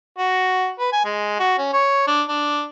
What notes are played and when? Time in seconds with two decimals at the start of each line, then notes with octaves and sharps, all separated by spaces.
0.18 F#4
0.79 B4
0.93 G#5
1.05 G#3
1.39 F#4
1.58 C#4
1.73 C#5
2.08 D4
2.28 D4